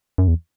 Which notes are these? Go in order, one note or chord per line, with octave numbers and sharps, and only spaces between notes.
F#2
E2